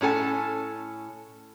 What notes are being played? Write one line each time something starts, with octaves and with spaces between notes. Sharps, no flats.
A2 C#4 A4 G#5